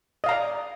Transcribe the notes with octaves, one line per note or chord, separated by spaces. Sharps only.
D5 D#5 F5 A#5